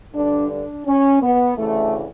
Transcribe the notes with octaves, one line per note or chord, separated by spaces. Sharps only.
G2 D3 D4
D4
C#4
B3
D2 C#3 E3 A3